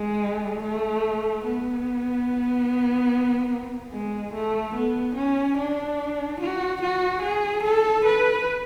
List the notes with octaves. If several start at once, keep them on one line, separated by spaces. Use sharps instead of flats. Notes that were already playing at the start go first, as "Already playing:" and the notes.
Already playing: G#3
A3
B3
G#3
A3
B3
C#4
D4
F#4
F#4
G#4
A4
B4